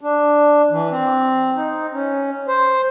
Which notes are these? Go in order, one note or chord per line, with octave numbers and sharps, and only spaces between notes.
D4
E3
C4
D#4
C#4
C5